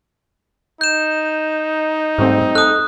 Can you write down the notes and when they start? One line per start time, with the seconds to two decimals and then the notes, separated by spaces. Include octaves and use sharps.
0.81 D#4 G6 E7
2.18 G#2 G3 A3 C4
2.55 A4 D#6 F#6